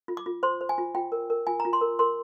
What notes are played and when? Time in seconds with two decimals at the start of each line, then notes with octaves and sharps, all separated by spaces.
0.08 F4
0.17 D6
0.26 F4
0.43 C5 C6
0.61 C5
0.69 G#5
0.78 F4
0.95 F4 G5
1.12 A#4
1.30 A#4
1.47 F4 G#5
1.60 A#5
1.65 F4
1.73 C6
1.81 A#4
1.99 A#4 C6